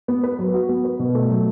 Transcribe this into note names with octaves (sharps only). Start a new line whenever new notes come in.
B3
B4
F#3
F#4
B3
B4
B2
A3
F#3